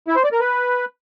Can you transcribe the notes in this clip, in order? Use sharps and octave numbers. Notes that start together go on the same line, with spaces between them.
E4
C5
D5
A#4
B4